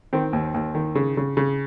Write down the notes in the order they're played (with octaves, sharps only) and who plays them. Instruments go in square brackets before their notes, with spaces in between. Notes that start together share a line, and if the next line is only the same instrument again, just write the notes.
[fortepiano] D#3 C4
D#2
D#2
D#3
C#3
C#3
C#3